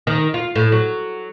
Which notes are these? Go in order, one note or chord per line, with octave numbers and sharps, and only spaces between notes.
D#3
F4
A2
F#3